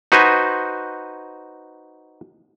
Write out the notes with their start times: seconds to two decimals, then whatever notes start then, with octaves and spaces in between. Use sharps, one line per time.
0.12 D#4 F#4 B4 C5 G#5